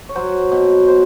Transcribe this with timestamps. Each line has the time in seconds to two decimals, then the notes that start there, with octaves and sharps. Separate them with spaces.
0.09 C#5
0.15 F#3 C5
0.52 B2
0.88 C5